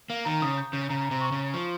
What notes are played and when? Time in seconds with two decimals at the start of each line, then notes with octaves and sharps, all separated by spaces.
0.10 A#3 F5
0.25 D#3 A#5
0.42 C#3 D#6
0.58 G6
0.73 C#3 G6
0.89 C#3 A#5
1.06 A#5
1.11 C3
1.21 C#6
1.32 C#3
1.38 C#6
1.54 F3 C#6